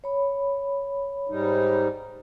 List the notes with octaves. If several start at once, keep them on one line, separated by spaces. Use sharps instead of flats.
C#5 B5
G#2 G3 D#4